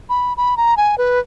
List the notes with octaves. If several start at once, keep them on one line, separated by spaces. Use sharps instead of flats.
B5
B5
A#5
G#5
B4